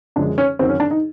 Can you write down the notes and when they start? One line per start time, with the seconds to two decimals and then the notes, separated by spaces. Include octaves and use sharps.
0.16 F#2 D3 F3 G#3 D4
0.38 C#4
0.59 F#2 D#3 F#3 C4
0.69 C#4
0.80 D4
0.91 D#4